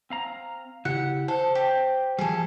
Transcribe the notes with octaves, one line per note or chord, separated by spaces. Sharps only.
C4 F5 A#5
C#3 E4 G4 F#5
A4 C5
G4
F3 G3 G#4 A4